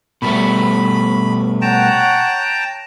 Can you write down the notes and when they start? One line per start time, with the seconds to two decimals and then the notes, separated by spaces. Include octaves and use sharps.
0.22 B2 G3 A3 B5
1.62 C#5 F#5 G5 A5 A#5